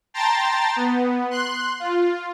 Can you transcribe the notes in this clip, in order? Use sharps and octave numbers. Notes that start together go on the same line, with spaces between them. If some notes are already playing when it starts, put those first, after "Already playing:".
G5 A5 A#5 C6 A6
B3
C6 F#6
F4